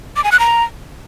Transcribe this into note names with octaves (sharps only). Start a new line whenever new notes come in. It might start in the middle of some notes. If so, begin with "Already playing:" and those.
D6
G#5
F#6
A#5